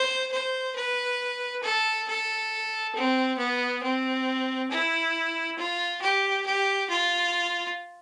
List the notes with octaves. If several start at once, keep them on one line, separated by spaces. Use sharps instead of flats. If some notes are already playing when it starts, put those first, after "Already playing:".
Already playing: C5
C5
B4
A4
A4
C4
B3
C4
E4
F4
G4
G4
F4